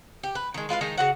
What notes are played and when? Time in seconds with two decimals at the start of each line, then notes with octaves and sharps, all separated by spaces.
0.23 G4
0.35 B4
0.54 D#3 G#3
0.69 G#3 F4 B4 F5
0.81 D#3 G#3 D#4 A#5
0.98 C#3 F#4 F#5